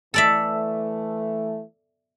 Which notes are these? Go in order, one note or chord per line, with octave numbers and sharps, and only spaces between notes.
E3 A3 A4 D5 E5